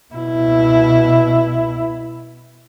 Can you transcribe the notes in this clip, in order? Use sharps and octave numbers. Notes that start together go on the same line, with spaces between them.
B2 E4